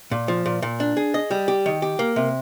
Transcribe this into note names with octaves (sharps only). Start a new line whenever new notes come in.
A#2
F3
A#2
A#2
D4
G#4
D#5
G3
G4
D#3
G4
A#3
C3